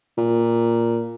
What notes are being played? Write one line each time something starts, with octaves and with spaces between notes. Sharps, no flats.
A#2